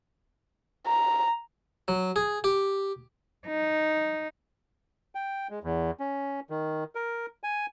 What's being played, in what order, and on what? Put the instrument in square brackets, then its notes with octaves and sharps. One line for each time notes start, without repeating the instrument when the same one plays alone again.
[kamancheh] A#5
[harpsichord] F#3
G#4
G4
[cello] D#4
[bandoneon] G5
G#3
E2
C#4
D#3
A#4
G#5